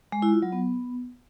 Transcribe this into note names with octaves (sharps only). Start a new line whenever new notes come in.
G#3
E4
F4
F#3
B3